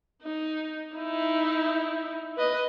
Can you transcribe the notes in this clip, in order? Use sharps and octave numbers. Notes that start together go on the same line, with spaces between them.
D#4
D#4 E4
B4 D#5